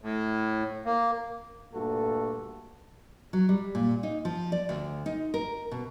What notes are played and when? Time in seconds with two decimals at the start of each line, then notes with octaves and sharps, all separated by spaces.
0.02 A2
0.86 A#3
1.73 G2 A#2 A3 F#4 A4
3.33 F#3
3.49 G3
3.75 A#2
4.03 D#4
4.25 F3
4.52 D5
4.69 D2
5.06 D#4
5.34 A#4
5.71 B2